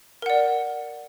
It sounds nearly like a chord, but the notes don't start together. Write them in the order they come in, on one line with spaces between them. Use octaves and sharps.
A#4 F#5 D5